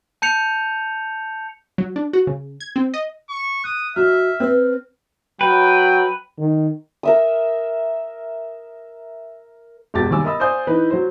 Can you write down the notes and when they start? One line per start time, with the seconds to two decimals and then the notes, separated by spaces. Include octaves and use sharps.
0.22 A5 G6 C#7 F7
1.78 F#3
1.96 D4
2.13 F#4
2.27 C#3
2.60 G#6
2.76 C4
2.94 D#5
3.29 C#6
3.64 D#6 F#6
3.96 F#3 D#5 E5 A#5 F6
4.40 C4 B4 C5
5.41 F#3 B4 G5
6.39 D#3
7.03 A#4 E5 D#6
9.94 E1 B2 G4 A5 A6
10.11 D#2 G3 G#5 D6 E6
10.25 A#4 D#5 B5 E6
10.40 C5 D5 F5 G#5 D#6 G6
10.67 E3 D#4 B4
10.90 F#3 C5